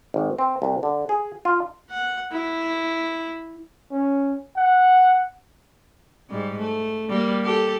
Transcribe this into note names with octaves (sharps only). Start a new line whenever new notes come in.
G#1
C4
C2
D3
G#4
F4
F#5
E4
C#4
F#5
G#2 G3
A3
G3 A#3
G4 A4